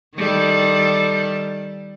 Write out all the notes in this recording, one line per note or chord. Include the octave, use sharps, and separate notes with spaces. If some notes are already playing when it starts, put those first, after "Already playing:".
D#3 G3 A4